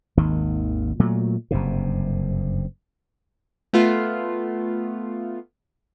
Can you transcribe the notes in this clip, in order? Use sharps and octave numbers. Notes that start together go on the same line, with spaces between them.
G#1 D#2 D#3
A#2 F#3 A3
F#1 G2 C3
A3 B3 F4 F5